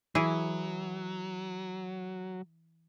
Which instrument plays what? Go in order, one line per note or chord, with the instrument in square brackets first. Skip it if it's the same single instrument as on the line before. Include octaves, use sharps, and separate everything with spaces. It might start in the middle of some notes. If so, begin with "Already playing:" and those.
[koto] E3 E4 G#4 [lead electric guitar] F#3